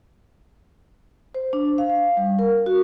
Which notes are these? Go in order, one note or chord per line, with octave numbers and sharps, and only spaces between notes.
C5
D4
F5
F5
G3
A#4
F#4